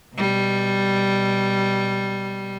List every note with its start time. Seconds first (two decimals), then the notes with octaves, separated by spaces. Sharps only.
0.15 B2 G3